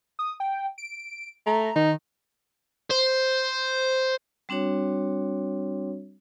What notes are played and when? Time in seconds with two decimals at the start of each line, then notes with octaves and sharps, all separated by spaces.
0.19 D#6
0.40 G5
0.78 D7
1.46 A3 A#5
1.76 D#3 D#4
2.90 C5
4.49 G3 C4 D4 F#4 C#5